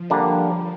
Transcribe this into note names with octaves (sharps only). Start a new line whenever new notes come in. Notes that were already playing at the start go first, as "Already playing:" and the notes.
Already playing: F3
D3 G3 A#3 D4